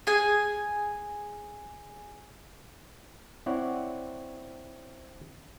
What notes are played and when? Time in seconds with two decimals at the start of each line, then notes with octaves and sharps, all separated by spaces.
0.07 G#4 G#5
3.46 C4 E4 C#5 D5 F#5